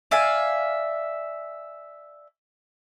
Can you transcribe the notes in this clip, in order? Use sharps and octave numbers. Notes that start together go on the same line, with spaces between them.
D5 E5 F5 G#5